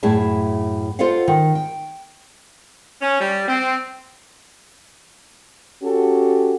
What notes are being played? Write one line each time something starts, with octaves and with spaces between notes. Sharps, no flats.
F#2 A2 E4 G#4 A5
F4 A4 C5 D#5 F5 F#5
D#3
G5
C#4
G3
C4
C#4 F#4 G4 A4